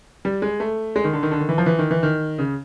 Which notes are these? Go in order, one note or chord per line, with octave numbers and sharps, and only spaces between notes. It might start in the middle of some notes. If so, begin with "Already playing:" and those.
G3
G#3
A3
G#3
D#3
D3
D#3
D3
D#3
E3
F3
E3
D#3
E3
D#3
C#3